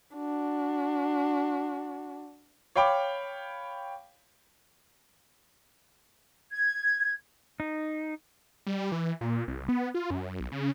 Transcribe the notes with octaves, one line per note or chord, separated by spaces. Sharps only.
D4 F#4
C#5 F5 G5 B5 D6
G#6
D#4
G3
E3
A#2
C2
B3
F4
F#2
B1
C#3